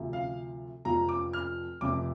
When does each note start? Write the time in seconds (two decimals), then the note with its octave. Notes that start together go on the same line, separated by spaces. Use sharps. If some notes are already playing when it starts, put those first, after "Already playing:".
Already playing: D2 C3 F3
0.13 F5
0.85 F1 F2 F3 A#5
1.09 D6
1.33 F6
1.81 F1 F2 C3 F3 D6